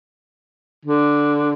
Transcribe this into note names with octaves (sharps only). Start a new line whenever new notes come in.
D3